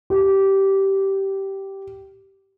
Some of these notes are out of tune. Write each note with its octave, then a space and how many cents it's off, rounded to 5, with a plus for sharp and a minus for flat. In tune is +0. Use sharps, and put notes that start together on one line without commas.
G4 -15